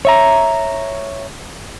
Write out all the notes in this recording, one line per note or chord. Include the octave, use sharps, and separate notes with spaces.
C#5 E5 A#5